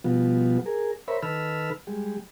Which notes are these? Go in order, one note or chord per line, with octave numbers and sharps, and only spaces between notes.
B2 F3 G3 B3 F4 F#4
G#4 A#4
A#4 C5 C#5 E5 B5
D#3 A4 B4 B5 E6 F6
G3 G#3